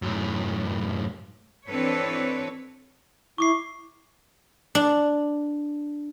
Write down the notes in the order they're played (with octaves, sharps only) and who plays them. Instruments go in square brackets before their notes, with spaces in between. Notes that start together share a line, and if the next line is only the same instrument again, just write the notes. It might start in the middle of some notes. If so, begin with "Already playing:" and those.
[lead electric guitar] F#2 A2
[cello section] E3 C4 D4 A4 B4 C#5
[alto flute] E4 [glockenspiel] C#6 D6 C7
[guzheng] D4